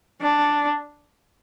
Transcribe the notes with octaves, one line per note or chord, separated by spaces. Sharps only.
D4